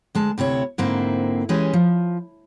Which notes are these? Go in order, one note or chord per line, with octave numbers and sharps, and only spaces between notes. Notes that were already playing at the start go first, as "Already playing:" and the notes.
D2 G#3 A5
D2 C3 E4 C#5
G#2 D3 A#3 C4 E4
E3 G#3 C#4 G4
F3